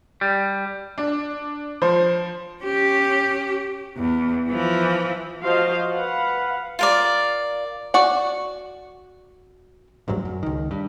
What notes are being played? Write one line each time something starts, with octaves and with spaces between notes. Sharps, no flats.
G3
D4
F3 C5
C#4 G4
E2
E3 F3
F3 F4 F#4 C5 D#5 F5
B4 F5 F#5
F4 A#4 D5
F#4 D5 F#5
A1 D2 G2 F#3
F#2
C#2 D#3
G2